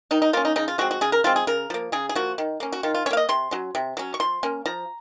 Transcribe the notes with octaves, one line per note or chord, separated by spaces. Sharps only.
D#3 D#4
D#4
A#3 C#4 F4
D#4
C#3 D#4
F4
F3 G#3 C4 F#4
F#4
C#3 G#4
A#4
F3 G#3 C4 F4
G#4
C#3 A#4
F3 A#3
C#3 G#4
G#4
F3 A#3 F#4
D#3
A#3 C#4
F#4
D#3 F4
F4
C#4 C#5
A#3 F5
D#5
C3 C6
F#3 C#4
C3
F#3 C#4
C#6
F3 C6
A#3 C#4
F3 A#5